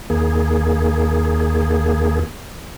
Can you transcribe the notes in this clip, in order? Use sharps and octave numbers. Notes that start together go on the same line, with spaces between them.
D#2 A#3 G#4